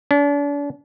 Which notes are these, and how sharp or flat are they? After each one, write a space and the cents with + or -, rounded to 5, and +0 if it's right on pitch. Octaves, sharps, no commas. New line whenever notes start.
D4 -40